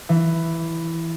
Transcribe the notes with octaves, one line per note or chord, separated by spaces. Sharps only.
E3